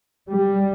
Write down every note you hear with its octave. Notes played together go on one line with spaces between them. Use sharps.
G3